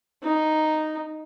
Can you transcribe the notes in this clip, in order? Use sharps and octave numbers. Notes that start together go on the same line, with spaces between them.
D#4